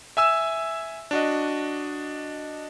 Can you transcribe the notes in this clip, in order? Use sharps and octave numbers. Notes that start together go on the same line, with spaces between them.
E5 G#5 E6 E7
D4 F#4 D#5